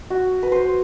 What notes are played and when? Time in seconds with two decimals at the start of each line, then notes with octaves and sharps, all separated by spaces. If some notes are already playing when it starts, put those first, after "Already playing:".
0.10 F#4
0.43 B4
0.52 C5